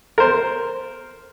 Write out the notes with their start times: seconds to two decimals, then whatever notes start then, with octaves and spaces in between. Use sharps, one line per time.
0.18 A#4 C5